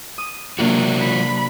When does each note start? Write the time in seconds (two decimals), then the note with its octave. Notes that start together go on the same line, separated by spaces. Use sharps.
0.18 D#6
0.59 C3 F#3 A#3 D4 F4 F#4
1.00 B5